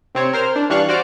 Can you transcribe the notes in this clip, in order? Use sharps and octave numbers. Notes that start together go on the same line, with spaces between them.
C3 C4 C#5
A#4 C5 F6
D4
E3 G3 D4 F5 C#6 F#6
F#4 C5 D5 D6 F6